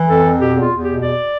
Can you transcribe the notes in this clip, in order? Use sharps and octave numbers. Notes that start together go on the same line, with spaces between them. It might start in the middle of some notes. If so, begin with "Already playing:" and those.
Already playing: E3
F2 A4
F2
B2 G4
E2
F4
E2
B2 G4
E2 D5